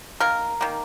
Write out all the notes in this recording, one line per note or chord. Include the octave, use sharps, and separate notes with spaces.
D#3 A#3 A#4
D#3 A#3